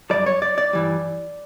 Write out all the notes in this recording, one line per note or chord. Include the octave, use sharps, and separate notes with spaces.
F#2 C#3 G3 D5
C#5
D5
D5
G2 E3 G3